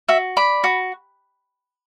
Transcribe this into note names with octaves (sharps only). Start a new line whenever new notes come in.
F#4 E5
D5 B5
F#4